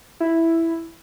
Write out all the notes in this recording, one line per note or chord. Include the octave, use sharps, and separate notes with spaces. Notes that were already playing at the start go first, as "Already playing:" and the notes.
E4